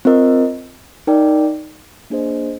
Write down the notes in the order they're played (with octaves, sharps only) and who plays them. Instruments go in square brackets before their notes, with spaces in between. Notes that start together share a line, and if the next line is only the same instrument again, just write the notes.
[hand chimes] C4 F4 A#4 D#5
D#4 A#4 D5 G5
A#3 D4 G#4 C5 D#5